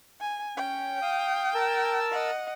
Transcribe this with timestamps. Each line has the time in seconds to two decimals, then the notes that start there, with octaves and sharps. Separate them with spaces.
0.21 G#5
0.57 C#4 G5
1.02 F5 D#6
1.55 A#4 A5 E6
2.11 D#5 F#5